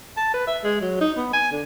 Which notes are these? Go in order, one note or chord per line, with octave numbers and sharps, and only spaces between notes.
A5
B4
E5
G#3
F#3
D#4
B3
G#5
D3